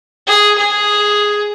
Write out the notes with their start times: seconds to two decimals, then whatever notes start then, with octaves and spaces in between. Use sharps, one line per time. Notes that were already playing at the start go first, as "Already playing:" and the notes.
0.27 G#4
0.58 G#4